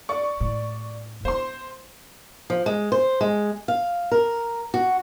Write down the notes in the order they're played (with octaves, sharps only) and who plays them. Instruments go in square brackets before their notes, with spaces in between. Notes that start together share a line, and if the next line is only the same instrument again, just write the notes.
[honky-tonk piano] D5 C#6
[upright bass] A2
[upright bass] B3 [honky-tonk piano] C5 C6
[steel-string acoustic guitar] F3
G#3
C5
G#3
F5
A#4
F#4